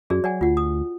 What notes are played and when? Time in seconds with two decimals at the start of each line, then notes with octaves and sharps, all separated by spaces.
0.10 F#2 F#4 G#4 D5
0.24 F#3 D5 F#5 G#5
0.41 D2 F4 F#5
0.57 D#6